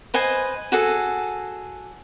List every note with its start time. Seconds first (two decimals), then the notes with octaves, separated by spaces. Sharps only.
0.14 B4 C5 D#5 G#5
0.72 F#4 G#4 A4